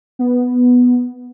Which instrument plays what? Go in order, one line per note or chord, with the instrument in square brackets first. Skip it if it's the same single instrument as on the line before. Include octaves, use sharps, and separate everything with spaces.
[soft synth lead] B3